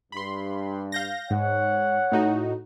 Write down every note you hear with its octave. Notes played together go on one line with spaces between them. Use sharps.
G2 B5 C6
F5 G6 A#6
G#2 C#5 F#5
A2 D#4 F#4